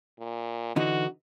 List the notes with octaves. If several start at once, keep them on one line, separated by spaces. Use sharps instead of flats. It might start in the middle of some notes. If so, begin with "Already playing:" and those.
A#2
D3 E3 D#4 F#4